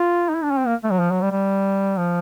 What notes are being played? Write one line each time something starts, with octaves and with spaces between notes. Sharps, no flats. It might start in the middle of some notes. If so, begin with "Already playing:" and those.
Already playing: F4
D#4
E4
D4
C#4
C4
A#3
A3
F#3
F3
F#3
G3
G3
F3